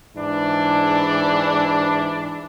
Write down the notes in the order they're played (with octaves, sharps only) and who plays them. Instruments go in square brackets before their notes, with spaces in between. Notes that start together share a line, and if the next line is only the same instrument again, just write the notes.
[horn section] G#2 E3 D4